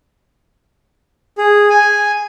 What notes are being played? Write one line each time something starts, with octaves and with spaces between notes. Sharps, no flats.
G#4
G#5